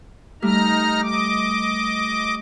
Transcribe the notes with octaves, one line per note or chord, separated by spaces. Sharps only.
G3 A3 D#4 A#5 F6
D#5 D6